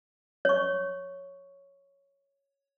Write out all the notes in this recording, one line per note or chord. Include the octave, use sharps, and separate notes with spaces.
C#5 C#6